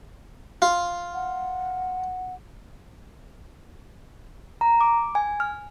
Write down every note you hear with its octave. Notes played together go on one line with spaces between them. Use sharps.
F4
F#5
A#5
D6
G#5
F6